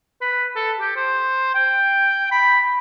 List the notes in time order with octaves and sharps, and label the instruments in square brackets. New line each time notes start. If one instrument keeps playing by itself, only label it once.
[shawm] B4
A4
G4
C5
G5
B5